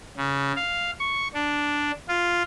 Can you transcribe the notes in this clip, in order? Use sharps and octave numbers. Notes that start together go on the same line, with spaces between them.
C#3
F5
C#6
D4
F4